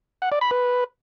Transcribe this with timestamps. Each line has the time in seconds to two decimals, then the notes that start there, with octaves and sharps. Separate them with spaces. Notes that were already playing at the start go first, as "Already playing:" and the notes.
0.22 F#5
0.32 D5
0.41 B5
0.51 B4